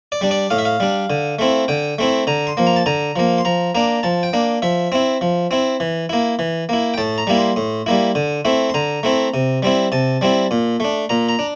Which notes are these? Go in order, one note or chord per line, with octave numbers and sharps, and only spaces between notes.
D5
G3 D4
D5
A2 F5
E5
F5
G3 D4
D3
A3 C4 E4
D3 G5
A3 C4 E4
D3 A#5
C6
F3 A#3
A#5
A5
D3 A#5
F3 A#3
C6
F3 A#5
A#3 D4 A#5
F3 A5
G5
A#3 D4
F3 E5
C4 E4
F3
C4 E4
E3
A#3 E4
E3
A#3 E4
G5
A2 A5
A#5
G3 A#3 E4
C6
A2
G3 A#3 E4
D3
A3 C4 E4
C6
D3 A#5
A3 C4 E4
C3
G3 C4 E4
C3 A5
G3 C4 E4
A#2
A3 D4
A#2 A#5
A#5
D4